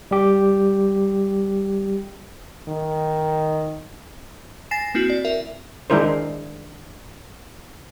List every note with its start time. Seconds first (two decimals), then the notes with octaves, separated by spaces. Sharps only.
0.11 G3 G4
2.68 D#3
4.71 G#5 A6 A#6 C7 E7
4.95 A#3 C4 E4 F#4
5.10 D5
5.25 A#4 E5
5.90 D#3 G#3 D4 E4 A#4 C5